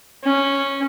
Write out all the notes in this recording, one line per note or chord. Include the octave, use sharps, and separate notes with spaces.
C#4